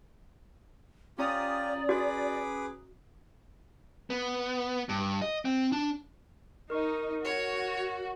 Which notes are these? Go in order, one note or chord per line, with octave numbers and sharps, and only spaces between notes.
C#4 F4 G4 D5 A#5 D#6
F#4 G#4 B4 D6
B3
G2
D#5
C4
D4
D#4 A#4 C#6
F#4 C#5